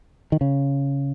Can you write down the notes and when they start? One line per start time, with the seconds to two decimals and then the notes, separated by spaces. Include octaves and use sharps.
0.32 D#3
0.41 C#3